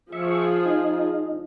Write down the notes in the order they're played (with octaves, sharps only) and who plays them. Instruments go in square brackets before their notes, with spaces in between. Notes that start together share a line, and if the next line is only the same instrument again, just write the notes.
[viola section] F3 G#4 [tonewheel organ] E5 C#6
[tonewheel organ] D#4